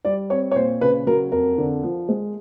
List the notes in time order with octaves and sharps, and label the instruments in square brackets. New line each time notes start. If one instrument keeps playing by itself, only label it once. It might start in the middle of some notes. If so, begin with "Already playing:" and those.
[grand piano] G3 D5
C4 C#5
C#5
A#2 C5
C#3 B4
F#3 A#4
F2 A#4
D3
F3
G#3